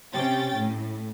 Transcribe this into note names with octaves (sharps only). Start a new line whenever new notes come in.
C3 C#4 G5 A6
A2